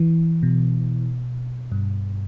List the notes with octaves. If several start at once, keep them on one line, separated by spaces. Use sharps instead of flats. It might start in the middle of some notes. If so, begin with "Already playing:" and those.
Already playing: E3
B2
G2